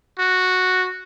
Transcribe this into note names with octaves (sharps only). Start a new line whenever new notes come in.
F#4